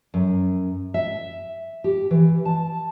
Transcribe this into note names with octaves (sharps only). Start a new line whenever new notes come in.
F#2
E5
G4
E3
A5